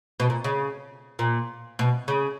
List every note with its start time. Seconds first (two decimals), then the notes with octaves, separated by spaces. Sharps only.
0.20 B2
0.30 A#2
0.44 C#3
1.19 A#2
1.79 B2
2.08 C#3